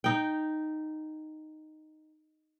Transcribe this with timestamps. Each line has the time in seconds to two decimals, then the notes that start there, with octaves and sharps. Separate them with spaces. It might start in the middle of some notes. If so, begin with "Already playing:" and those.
0.04 D#4 G5